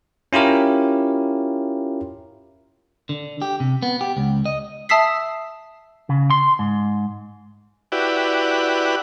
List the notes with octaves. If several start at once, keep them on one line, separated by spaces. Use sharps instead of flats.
C#4 E4 F4 G4 A#4
D3
G4
C3
B3
G4
C#2
D#5
E5 A5 D#6 E6 B6 C7
C#3
C6
G#2
E4 F#4 G4 B4 D5